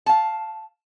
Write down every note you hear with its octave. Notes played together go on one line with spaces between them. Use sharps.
F5 A5